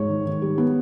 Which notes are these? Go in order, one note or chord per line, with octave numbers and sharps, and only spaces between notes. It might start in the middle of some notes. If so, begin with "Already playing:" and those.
Already playing: G#2 C#5
D#3
D#3
G3
B3